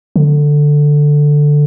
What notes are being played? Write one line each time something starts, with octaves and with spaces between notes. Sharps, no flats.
D3